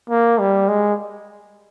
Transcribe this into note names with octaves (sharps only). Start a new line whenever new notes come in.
A#3
G3
G#3